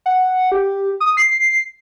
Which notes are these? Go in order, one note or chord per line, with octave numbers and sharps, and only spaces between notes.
F#5
G4
D#6
C7